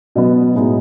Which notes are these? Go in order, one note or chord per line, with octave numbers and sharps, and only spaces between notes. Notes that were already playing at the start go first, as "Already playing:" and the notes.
B2 F#3 B3 D#5
A2 G#3 B3 D#4